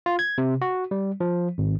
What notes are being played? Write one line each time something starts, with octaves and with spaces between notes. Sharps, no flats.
F4
G#6
C3
F#4
G3
F3
G#1